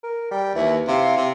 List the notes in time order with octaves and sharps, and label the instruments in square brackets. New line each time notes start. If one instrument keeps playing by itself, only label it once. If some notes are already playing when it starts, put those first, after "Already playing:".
[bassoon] A#4
[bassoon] G3 [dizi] G5
[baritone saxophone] D#2 [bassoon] E3 [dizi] E5
[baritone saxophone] C3 [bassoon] E4 [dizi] F5
[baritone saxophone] C3